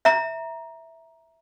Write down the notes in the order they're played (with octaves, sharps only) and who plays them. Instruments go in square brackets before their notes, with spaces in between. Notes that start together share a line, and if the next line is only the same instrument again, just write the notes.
[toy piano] E5 A#5